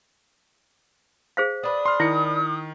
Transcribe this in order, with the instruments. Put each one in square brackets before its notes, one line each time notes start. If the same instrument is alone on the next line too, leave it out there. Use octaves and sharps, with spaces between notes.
[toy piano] G#4 C5 F5
[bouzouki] D4 B4 [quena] D#6
[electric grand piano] C6 F6
[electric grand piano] D#3 C#7 [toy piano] E4